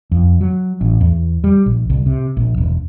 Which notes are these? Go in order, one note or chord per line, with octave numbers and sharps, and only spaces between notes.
F2
F#3
A1
E2
G3
A#1
C2
C3
A#1
E1